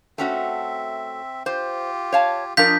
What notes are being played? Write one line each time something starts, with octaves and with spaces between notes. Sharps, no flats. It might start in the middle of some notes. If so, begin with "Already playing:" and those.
A3 C4 C#4 F#4 E5
F4 G4 C5
C#5 F5 A5
F3 D4 F4 A#4 D#5 F5 G6 B6